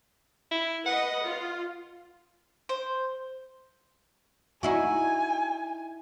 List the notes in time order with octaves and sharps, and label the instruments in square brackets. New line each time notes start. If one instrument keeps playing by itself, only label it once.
[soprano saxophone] E4
[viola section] B4 D#5 [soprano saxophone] F#5
[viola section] F4
[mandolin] C5
[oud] D#4 E4 F#4 [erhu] G#5